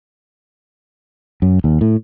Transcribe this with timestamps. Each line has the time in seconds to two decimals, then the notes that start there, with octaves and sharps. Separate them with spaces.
1.42 F#2
1.64 D#2
1.81 A2